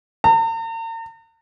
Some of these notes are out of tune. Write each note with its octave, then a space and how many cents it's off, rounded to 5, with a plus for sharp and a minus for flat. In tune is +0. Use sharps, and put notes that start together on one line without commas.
A#5 -45